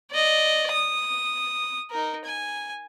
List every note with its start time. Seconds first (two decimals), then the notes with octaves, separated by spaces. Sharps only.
0.11 D5 D#5
0.71 D#6
1.91 D#4 A#4
2.25 G#5